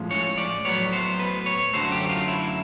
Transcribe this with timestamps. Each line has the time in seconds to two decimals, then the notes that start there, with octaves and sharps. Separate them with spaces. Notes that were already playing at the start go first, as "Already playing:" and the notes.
Already playing: A2 F3 G#3 C#4
0.11 C#5
0.38 D5
0.65 A2 F#3 B3 C#5
0.93 C5
1.19 B4
1.46 C#5
1.73 F#2 D3 F#3 A3 C5
1.92 G4
2.09 F4
2.28 E4